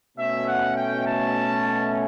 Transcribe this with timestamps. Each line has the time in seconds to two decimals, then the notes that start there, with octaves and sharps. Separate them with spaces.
0.18 B2 A3 C#4 E5
0.46 F#5
0.77 G5
1.06 A5